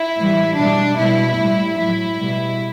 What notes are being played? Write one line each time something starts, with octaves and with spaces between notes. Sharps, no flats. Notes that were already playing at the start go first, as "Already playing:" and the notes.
Already playing: E4
A2 E3 G3
B2 G3 D4
B2 G3 E4
A2 G3
A2 F#3 E4
B2 G3